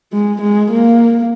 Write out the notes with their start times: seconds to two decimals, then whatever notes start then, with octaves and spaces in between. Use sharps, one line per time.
0.12 G#3
0.41 G#3
0.70 A#3